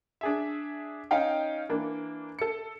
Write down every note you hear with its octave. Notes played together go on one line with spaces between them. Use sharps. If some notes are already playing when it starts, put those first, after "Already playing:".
D4 G#4 E5
C#4 D#4 F5 G5
E3 A#3 D4
A4 C#7